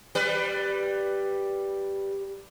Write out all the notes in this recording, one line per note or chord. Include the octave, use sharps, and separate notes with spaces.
G3 B4